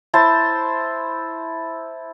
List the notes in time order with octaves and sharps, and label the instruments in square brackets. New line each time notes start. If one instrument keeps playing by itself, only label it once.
[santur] E4 C5 A5